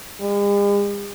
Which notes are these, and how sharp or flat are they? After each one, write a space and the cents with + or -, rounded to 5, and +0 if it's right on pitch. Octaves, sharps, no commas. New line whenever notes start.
G#3 -45